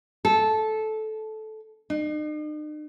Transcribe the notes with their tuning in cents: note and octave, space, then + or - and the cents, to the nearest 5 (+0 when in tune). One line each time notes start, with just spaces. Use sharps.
A4 -15
D#4 -45